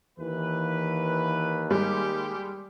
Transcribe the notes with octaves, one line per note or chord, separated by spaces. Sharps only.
D#2 E3 B4
G3 G#3 G4